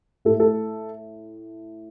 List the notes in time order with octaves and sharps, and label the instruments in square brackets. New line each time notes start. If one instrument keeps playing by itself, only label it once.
[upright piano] A2 A4
A4